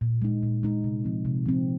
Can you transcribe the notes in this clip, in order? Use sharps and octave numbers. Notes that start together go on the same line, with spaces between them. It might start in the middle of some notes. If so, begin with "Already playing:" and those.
A#2
G#3 D#4
A#2
G#3 D#4
C3
F3 C4
C3
F3 C4